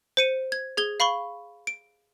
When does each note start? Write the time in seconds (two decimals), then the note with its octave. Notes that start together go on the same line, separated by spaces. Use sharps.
0.17 C5 C#7 D#7
0.52 G#6
0.77 G#4 G#6 G7
1.00 F5 B5 C#6 G7
1.67 D7